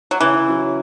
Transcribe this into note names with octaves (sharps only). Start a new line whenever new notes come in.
F#3
C#3 E3
F#3 C#4